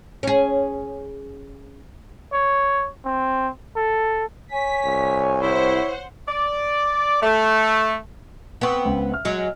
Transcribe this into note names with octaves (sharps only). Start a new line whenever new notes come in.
C#4 G#4
C#5
C4
A4
C#5 G#5 B6
C2
E4 C5 F#5
D5
A3
B3 C4 F#5 C#6 D#6
C#2
E5 F6
F#3 G#3